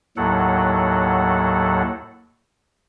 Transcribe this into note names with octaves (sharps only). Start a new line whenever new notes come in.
D#2 A2 F#3 A4 F#5